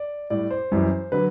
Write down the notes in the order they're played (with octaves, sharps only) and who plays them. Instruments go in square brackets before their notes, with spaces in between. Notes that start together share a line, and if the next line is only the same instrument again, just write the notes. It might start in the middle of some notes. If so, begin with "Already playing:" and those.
Already playing: [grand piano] D5
A2 G3 D5
C5
F#2 E3 G3
D3 F#3 B4